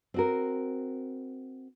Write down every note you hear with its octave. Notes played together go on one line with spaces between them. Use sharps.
C4 F#4 A#4